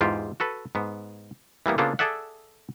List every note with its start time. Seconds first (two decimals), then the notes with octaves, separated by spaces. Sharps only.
0.01 E2 G#2 F4 G4
0.40 F#4 A4 B4
0.75 G#2 B3
1.66 E3 G3 A#3 B3
1.78 C#3 A#3 B3 D4 F4 A4
1.99 G#4 A4 D5 E5 F#5